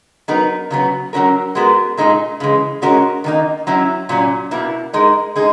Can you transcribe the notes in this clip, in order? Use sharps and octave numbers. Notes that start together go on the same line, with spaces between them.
F#3 B3 D#4 A#4
C#3 F#3 B3
F#3 C#4 F#4 A#4
G#3 B3 F#4 A#4
A#2 G#3 D#4 G#4
C#3 E3 G#3
G#3 C#4 F#4 A#4
D#3 A#3 D#4
F#3 C#4 E4
A#2 F#3 C#4
B2 A#3 E4
G#3 D#4 A#4
G#3 D#4 G#4